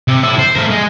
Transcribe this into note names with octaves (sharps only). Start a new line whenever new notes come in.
C3
E4 A4
C5
A3 A#4
G#3